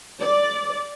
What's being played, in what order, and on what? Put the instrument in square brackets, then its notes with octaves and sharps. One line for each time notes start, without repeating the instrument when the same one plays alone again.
[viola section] D5